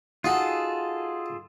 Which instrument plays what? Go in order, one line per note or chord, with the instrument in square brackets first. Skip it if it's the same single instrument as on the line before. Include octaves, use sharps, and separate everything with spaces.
[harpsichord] D#4 F#4 [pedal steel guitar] F4 G#4 A4